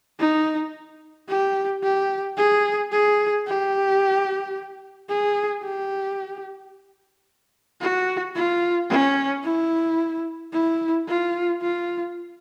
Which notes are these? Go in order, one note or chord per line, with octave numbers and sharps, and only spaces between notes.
D#4
G4
G4
G#4
G#4
G4
G#4
G4
F#4
F4
C#4
E4
E4
F4
F4